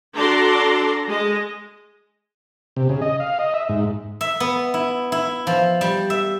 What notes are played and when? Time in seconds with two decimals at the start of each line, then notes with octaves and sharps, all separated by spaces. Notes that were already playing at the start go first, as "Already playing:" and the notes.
0.15 D4 F#4 A4 D5 A#5 C6
1.08 G#3 D#5
2.76 C3
2.89 C#3
3.02 D#5
3.20 F5
3.39 D#5
3.54 E5
3.69 G#2
4.21 E5
4.40 B3
4.74 E4
5.12 E4
5.47 F3
5.81 G3
6.10 E5